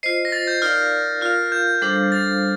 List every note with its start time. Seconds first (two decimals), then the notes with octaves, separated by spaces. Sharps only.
0.03 F4 C5 D#5 C7
0.25 A#6
0.32 A6
0.47 G6
0.62 D#4 A#4 D5 F5 F6
1.21 F4 A#4 F5 F6
1.52 G6
1.82 G3 D4 A4 C5 F5
2.12 A6